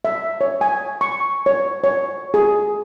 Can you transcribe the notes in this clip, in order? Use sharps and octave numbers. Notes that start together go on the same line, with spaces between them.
E5
C#5
G#5
C#6
C#5
C#5
G#4